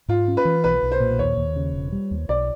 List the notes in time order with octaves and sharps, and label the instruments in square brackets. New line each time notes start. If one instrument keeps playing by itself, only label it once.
[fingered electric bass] G#2 [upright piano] F4
[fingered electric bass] C#4
[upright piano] B4
[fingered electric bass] E3
[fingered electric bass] B1 [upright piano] B4
[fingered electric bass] B1
[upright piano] C5
[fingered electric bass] A#2
[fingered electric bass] D#2 [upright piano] C#5
[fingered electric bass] D#2
C#3
E1
G3
D#2
[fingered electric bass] B1 [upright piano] D5